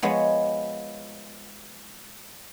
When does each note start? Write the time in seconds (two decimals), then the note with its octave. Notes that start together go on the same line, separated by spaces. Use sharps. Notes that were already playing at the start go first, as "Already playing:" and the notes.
0.02 F3 G#3 B3 C#5